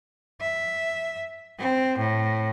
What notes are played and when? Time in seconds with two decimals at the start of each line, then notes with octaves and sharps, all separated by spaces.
0.41 E5
1.59 C4
1.98 A2